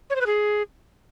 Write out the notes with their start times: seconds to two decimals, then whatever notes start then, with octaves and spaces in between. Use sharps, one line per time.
0.10 C#5
0.15 C5
0.21 B4
0.26 G#4